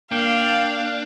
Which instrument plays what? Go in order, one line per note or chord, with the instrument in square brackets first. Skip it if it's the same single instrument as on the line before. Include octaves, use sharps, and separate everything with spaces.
[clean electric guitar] A#3 [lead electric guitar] D4 [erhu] F5 [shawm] G5